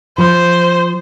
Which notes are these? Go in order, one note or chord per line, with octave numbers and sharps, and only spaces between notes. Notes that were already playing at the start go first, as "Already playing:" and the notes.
F3 C5